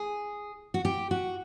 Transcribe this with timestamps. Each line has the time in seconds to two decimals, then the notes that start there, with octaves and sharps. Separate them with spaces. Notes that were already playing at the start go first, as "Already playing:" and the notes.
Already playing: G#4
0.74 F#4
0.85 G4
1.11 F#4